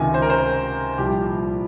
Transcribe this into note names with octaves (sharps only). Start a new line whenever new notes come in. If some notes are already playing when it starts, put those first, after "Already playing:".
Already playing: C#2 C3 D#3 G#5
C5
A#4
C5
A#4
C2 A#2 F3 G4